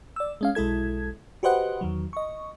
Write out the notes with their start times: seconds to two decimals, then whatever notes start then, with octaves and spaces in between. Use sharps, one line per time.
0.16 D5 E6
0.41 G#3 C#4 F5
0.55 B1 G#3 E4 A4 G#6
1.43 F#4 G4 B4 C5 D#5 F#5
1.81 E2 D#3 F#3
2.13 D#5 C#6